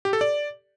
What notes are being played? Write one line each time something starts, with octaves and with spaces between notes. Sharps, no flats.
G4
A4
D5